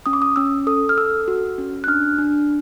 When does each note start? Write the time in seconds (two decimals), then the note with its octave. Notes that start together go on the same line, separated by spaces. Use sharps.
0.06 C#4 D#6
0.13 D6
0.22 D#6
0.36 C#4 E6
0.67 A4 D#6
0.89 F6
0.97 A4 E6
1.28 F#4
1.58 C#4
1.84 F#6
1.87 D4 F6
2.18 D4